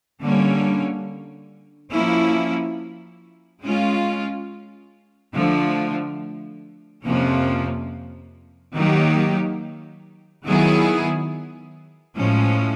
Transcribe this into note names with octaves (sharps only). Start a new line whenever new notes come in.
D3 G3 A#3 C#4
F3 A#3 C#4 E4
G#3 C#4 F4
D3 F3 A3
F2 C3 F3 A#3 C#4
D#3 F#3 A#3 D#4 G4
D#3 F#3 B3 E4 G#4
A2 F3 G#3 C#4